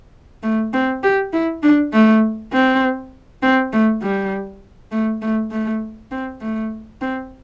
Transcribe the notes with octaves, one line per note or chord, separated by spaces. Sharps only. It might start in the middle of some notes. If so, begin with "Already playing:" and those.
A3
C4
G4
E4
D4
A3
C4
C4
A3
G3
A3
A3
A3
C4
A3
C4